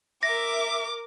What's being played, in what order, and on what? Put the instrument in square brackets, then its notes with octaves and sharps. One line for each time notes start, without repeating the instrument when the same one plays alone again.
[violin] A#4 D6 [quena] E5 [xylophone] A#6